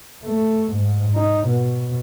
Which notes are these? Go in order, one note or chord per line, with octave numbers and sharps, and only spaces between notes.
A3
G#2
D#4
B2